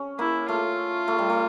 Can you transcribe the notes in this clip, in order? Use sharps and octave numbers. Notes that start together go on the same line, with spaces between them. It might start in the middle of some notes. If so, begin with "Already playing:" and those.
Already playing: C#4
A#3 E4
A3 F4
A3
G3
A3